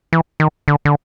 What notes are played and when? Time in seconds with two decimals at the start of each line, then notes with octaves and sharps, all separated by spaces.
0.13 E3
0.40 D#3
0.68 D3
0.85 D3